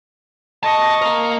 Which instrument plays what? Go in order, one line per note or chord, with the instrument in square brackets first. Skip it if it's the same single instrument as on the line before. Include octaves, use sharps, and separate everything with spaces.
[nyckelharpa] D#5 C#6 [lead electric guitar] A5
[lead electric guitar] A#3 A#4